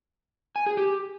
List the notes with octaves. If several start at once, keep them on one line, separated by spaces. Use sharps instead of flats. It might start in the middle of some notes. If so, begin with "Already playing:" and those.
G#5
G#4
G4